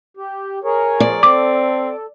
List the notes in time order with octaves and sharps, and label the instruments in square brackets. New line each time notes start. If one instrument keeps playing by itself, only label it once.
[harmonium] G4
G#4 A#4 C#5
[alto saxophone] F3 [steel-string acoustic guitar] D5
[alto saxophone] C4 [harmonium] A4 [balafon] D6